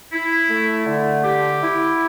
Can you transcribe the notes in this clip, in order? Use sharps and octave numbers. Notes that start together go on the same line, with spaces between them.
E4
A3
D3
G4
E4